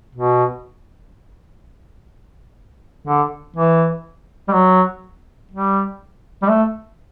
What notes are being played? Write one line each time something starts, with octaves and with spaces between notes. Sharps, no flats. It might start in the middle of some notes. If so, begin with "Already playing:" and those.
B2
D3
E3
G3
F#3
G3
G3
A3